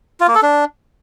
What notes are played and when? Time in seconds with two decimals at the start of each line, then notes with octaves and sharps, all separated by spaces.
0.20 F4
0.28 A#3
0.35 A4
0.43 D4